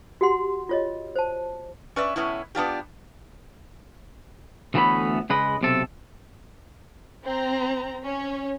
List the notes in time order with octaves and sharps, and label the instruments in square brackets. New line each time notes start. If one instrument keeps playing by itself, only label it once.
[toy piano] F#4 G4 F#5 C6
F4 C#5 D#5
C5 A5
[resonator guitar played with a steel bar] C#4 B4 D5 E5
A2 B3 C#4 E4
B3 D4 F4 G4
[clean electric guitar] D2 E3 A3 B3 C#5 B5
C#3 G#3 B4 D#5
B1 C3 A4
[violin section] C4 A#5
C#4 C#5